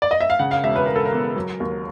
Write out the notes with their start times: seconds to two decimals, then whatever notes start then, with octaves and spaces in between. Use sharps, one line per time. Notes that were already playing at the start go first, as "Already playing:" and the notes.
0.02 D5
0.11 D#5
0.21 E5
0.30 F5
0.39 C#3 F#5
0.51 F5
0.63 E1 E5
0.76 B4
0.86 E1 A#4
0.96 A4
1.05 A#4
1.12 E2
1.36 F#3
1.60 D#2